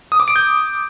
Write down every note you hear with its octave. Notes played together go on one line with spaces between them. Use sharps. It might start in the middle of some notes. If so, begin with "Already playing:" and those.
D#6
D6
D7
G6